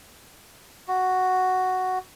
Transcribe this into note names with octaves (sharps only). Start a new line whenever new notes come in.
F#4